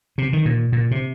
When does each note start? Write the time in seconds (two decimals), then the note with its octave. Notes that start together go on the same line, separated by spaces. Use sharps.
0.18 C3
0.33 D#3
0.45 A#2
0.72 A#2
0.91 C3